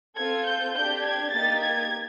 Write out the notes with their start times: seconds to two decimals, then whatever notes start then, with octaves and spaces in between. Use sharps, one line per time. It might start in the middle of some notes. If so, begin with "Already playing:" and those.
0.17 C4 F4 A4 G#6
0.46 G6
0.75 D4 G4 G6
1.04 G#6
1.32 A#3 D#4 G4 A6
1.61 G#6